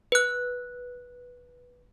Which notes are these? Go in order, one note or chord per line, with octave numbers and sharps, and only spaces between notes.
B4 F#6